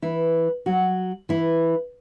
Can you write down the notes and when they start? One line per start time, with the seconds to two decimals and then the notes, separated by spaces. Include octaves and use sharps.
0.02 E3 E4
0.66 F#3 F#4
1.29 E3 E4